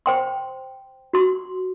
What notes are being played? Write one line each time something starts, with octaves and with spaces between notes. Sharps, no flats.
C5 G5 C6
F#4 C6